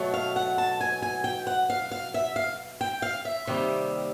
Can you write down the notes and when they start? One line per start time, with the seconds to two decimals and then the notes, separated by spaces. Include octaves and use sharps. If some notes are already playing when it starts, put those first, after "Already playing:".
Already playing: B2 F#3 A3
0.14 F5
0.36 F#5
0.58 A5
0.81 G#5
1.02 G#5
1.24 G5
1.47 F#5
1.70 F5
1.91 F5
2.14 E5
2.36 F5
2.81 G5
3.02 F5
3.25 E5
3.47 C3 D#3 G3 A#3